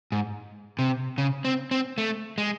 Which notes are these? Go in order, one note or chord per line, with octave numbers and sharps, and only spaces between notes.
G#2
C3
C#3
C4
C4
A3
G#3